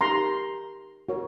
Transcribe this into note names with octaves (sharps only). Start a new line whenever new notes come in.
D#4 G4 A#4 A#5 C6
F#4 A#4 C#5